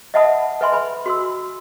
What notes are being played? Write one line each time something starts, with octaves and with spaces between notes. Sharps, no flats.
D#5 E5 F#5 A5 B5 D#6
B4 D#5 E5 G#5 B5 C6
B4 G#5 B5
F#4 C6 E6